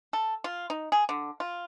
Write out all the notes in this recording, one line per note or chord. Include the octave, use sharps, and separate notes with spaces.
A4
F4
D#4
G#4
D3
F4